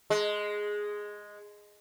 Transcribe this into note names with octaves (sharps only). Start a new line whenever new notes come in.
G#3